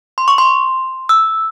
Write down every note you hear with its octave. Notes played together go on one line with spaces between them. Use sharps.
C6
C#6
C6
E6